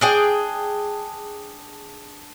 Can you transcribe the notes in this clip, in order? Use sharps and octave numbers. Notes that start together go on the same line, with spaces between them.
D4 G#4 G5